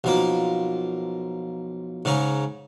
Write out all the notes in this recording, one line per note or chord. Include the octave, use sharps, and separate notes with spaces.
B1 F3 A#3
G#2 C#3 C#4 A#5